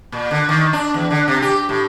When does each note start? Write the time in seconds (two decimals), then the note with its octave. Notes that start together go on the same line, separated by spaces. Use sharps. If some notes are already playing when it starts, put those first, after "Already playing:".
0.12 A#2
0.31 D3
0.49 D#3
0.73 D4
0.94 E2
1.11 D3
1.28 C3
1.42 G4
1.69 A2